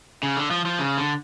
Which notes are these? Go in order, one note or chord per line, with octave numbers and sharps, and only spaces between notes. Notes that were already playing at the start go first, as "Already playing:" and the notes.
C#3
D3
F3
F3
C#3
D3